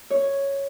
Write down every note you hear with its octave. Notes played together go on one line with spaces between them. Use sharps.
C#5